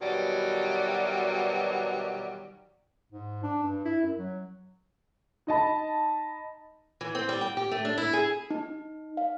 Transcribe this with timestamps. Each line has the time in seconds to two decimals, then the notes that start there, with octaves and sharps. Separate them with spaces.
0.02 B2 D#3 E3 F#3 G3
3.12 G#2
3.43 D4
3.63 G2
3.85 E4
4.02 F#2
4.18 F#3
5.47 D#4 D#5 A5 B5
7.01 E3
7.15 C4
7.29 G3
7.41 G5
7.57 G4
7.71 A3
7.85 D4
7.98 E4
8.13 G#4
8.50 D#4
9.17 F5